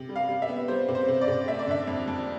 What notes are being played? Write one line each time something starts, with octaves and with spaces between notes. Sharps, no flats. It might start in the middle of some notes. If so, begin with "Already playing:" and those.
Already playing: C3
G3
F5
G3
E5
B3
G3 C5
C3
C5
C3
D5
C3
A3 E5
D5
D3 E5
F2
F2